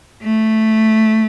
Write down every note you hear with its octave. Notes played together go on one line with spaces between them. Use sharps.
A3